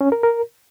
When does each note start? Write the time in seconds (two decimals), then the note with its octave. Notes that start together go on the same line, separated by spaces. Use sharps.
0.01 C#4
0.12 A#4
0.23 A#4